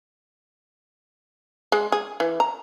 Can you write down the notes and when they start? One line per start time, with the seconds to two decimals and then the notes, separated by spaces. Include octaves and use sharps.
1.72 G#3
1.92 G#4
2.20 E3
2.40 A#5